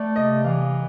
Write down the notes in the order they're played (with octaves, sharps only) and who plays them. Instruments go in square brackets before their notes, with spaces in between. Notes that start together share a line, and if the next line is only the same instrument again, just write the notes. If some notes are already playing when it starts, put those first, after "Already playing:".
Already playing: [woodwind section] A3 [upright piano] D5
[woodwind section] C3 [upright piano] D#5
[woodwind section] E3 [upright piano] F5